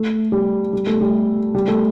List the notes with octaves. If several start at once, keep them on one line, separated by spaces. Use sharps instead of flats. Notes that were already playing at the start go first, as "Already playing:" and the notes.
Already playing: A3
G3
G3
A3
G3
G3
A3